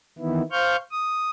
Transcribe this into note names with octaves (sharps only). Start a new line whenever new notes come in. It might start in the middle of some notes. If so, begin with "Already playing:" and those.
D#3 E3 B3 E4
C5 F5 C#6 F6 G6
D#6